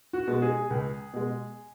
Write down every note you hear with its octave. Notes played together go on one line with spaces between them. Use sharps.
F#4
B2 G#3
G#4
C#2
B2 G#3